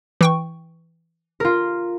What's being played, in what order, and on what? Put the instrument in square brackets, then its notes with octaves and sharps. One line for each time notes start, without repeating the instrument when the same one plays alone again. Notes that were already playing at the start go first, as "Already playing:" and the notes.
[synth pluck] E3 G5 C#6
[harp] F4 A#4